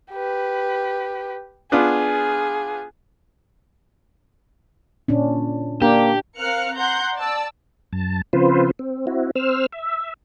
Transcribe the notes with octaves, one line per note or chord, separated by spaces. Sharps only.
G4 B4
B3 D4 F4 G#4
A#2 C#4 D4
A#3 D4 G4
C4 A#4 F5 F6 F#6 C#7
F#5 A#5 C6 F#6 G6
D5 A5 E6
F#2 A5
C#3 F3 C4 F4 B4 C5
C4
C4 E4 F#4
C4 C5 E6 F6
E5